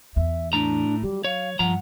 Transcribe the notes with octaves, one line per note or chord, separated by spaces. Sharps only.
E2 E5
A2 D4 A#5
F#3 G3
C#5 F5
G2 F3 F#5 A#5